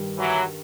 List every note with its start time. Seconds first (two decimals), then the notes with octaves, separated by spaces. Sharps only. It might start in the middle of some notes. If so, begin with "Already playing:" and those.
Already playing: G2 D#3 G3
0.18 E3 F#3